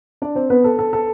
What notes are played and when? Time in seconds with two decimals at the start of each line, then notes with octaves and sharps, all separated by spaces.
0.22 D4 D5
0.35 C4 C5
0.50 B3 B4
0.64 A4
0.79 A4
0.93 A4